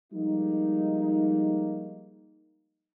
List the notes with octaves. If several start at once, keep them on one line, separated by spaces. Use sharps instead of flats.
F3 G3 G#3 A#3 D#4